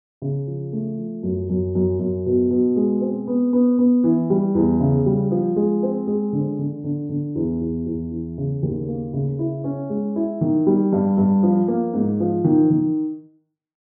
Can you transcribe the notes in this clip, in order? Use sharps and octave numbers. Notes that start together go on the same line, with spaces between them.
C#3
F3
A3
F3
F#2
F#2
F#2
F#2
B2
B2
G#3
C4
B3
B3
B3
E3
G3
E2
C#3
G3
F3
G#3
C4
G#3
D3
D3
D3
D3
E2
E2
E2
E3
C#3
D#2
A#3
C#3
E4
C#4
G#3
E4
D#3
G3
G2
G2
F3
A#3
G#2
F3
D#3
D#3